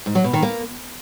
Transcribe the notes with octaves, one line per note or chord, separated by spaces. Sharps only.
G#2
F#3
B2
D#3
A#3